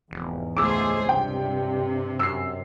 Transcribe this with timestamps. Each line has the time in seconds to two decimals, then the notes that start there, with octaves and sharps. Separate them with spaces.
0.11 F1 E2 G#2
0.57 C#2 A3 G#4 C5 D6 E6
1.09 G2 C3 G5
2.19 F#2 E6 C7